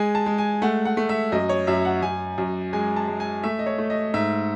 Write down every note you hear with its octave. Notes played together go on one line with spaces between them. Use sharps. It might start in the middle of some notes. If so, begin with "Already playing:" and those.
Already playing: G#3 G#5
A5
G#3
G#5
A3 F#5
F#5
A3
E5
F#2 D#5
C#5
F#2 E5
F#5
F#2 G#5
F#2
G#3 G#5
A5
G#3
G#5
A3 E5
D#5
C#5
A3
D#5
G#2 E5